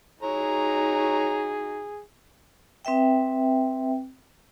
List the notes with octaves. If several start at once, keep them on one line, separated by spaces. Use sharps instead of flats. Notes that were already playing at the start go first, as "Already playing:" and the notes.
D#4 F#4 G#4 C#5 A#5
C4 B4 E5 G5